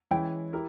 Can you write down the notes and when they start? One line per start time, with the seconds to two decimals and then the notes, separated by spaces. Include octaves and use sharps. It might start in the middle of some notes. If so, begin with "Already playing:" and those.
0.11 E3 G#3 C#4 E4 G5
0.53 E4 G4 A#4